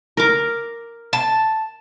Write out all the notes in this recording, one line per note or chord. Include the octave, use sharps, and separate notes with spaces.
A#4 D6
A5